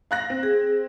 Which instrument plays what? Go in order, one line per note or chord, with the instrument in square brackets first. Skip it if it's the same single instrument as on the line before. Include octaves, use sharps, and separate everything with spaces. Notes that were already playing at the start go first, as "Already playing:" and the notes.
[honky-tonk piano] F5 F#6 A#6
C4
[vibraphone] G#4